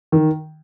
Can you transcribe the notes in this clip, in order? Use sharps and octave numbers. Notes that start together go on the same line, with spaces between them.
D#3